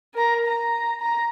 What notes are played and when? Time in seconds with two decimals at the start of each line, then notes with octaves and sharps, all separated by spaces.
0.14 A#4 A#5
0.46 A#5
1.01 A#5